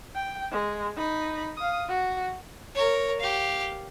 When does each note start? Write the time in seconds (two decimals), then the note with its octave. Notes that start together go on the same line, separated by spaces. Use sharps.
0.15 G5
0.52 G#3
0.97 D#4 B5
1.57 F5 D#6
1.89 F#4
2.75 A#4 C#5
3.20 G4 F5